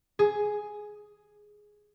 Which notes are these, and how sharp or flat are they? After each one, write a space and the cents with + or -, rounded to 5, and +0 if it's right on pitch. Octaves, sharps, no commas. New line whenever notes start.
G#4 +5